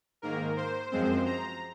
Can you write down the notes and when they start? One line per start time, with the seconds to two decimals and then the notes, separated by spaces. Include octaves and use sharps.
0.22 G#2 D#3 A#3 A#4
0.57 C5
0.91 F#2 F3 G#3 C4 C5
1.26 A#5